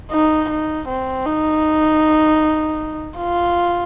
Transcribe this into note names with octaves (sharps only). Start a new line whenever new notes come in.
D#4
D#4
C4
D#4
F4